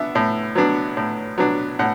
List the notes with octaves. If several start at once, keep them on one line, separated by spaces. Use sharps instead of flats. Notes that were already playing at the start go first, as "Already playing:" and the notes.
Already playing: B3 D4 E5
A2
F#3 B3 D4
A2
F#3 B3 D4
A2 F#5